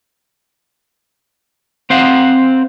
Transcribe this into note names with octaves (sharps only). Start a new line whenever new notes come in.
C4 C5 F5 F#5